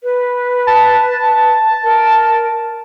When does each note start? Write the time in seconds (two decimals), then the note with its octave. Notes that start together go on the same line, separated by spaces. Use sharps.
0.03 B4
0.67 A5
1.83 A#4